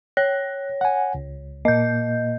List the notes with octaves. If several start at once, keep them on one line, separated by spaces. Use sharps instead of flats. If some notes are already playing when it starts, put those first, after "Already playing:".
C#5 F#6
F#5 G#5
C#2
A#2 A#3 D#5 G6